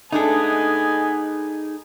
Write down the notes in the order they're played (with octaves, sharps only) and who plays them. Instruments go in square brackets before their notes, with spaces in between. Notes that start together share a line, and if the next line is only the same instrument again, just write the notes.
[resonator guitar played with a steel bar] A3 D4 A4 [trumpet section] B3 D#5 G#5 [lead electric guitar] D#4 G#4